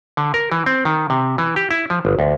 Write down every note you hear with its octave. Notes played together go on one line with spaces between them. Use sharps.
D3
A#4
E3
C4
D#3
C3
E3
G4
E4
F3
G1
D2